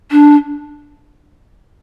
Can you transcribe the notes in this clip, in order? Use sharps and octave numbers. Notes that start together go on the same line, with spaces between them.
D4